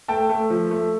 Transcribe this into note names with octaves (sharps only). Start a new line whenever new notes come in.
A3 G5 A5
A3
F3
A3